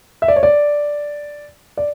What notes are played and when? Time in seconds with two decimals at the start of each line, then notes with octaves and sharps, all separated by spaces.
0.22 E5
0.28 D5
0.36 C#5
0.43 D5
1.77 D5